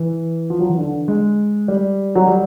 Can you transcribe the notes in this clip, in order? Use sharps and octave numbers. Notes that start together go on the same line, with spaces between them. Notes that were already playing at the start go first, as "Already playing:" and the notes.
Already playing: E3
F3
F#3
E3
D3
G#3
G3
F#3
G3